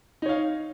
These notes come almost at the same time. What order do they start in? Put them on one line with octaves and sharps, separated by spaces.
D#4 C#5 F5